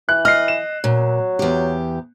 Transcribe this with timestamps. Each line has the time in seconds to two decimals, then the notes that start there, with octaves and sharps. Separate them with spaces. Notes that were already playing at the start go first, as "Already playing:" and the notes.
0.09 E3 F#6
0.25 D#5 F6 C7
0.48 E7
0.84 A#2 F#3
1.39 E2 G4